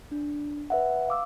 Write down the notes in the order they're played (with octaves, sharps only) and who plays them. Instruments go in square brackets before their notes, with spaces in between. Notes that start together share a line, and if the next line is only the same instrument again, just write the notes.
[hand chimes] D4
B4 E5 F#5
F5 D6 E6